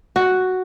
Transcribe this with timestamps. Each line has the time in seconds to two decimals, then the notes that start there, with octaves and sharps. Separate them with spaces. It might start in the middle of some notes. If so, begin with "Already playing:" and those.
0.16 F#4